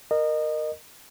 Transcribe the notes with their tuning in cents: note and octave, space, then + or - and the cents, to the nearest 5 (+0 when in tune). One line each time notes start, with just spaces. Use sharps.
A#4 +0 D#5 -25